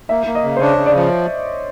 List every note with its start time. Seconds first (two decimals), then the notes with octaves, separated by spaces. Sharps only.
0.09 A#3 E5
0.27 A#3
0.35 D#5
0.44 C#3
0.56 C5
0.61 D4 C#5
0.77 C#3
0.86 D5
0.96 F3